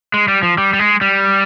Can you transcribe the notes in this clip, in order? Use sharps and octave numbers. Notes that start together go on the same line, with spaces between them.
G#3
G3
F3
G3
G3
G#3
G3